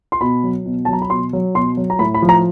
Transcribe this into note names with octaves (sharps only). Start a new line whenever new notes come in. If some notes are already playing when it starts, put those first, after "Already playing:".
C6
B2 B5
F#3
B2
F#3 A5
A#5
B5
B2 C6
F#3
B2 C6
F#3
A#5
A2 B5
B5
F3
A#5